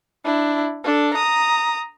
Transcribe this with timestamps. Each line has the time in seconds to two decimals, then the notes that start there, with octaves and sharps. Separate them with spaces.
0.25 D4 E4
0.84 D4 A4
1.14 A#5 D#6